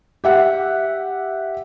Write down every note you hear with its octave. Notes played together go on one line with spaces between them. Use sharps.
G4 E5 F#5